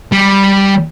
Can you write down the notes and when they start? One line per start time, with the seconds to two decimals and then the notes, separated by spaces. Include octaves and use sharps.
0.12 G3